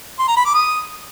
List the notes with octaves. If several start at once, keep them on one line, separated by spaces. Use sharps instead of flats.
C6
A#5
B5
D6
D#6